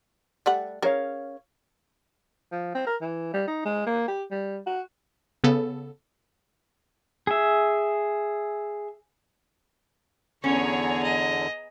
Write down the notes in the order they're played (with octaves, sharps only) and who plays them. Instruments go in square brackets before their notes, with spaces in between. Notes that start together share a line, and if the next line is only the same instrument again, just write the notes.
[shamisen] G3 A3 F#5
[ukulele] C#4 C#5 F5 [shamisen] G#4 A#4
[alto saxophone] F3
C4
A#4
E3
G3
D#4
G#3
A#3
G4
G3
F#4
[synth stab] C#3 B3 A4
[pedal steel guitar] G#4 E5
[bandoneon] E2 D3 [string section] B3 G#4 A#5 [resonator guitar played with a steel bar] C#4 [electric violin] C#5
[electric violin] D#5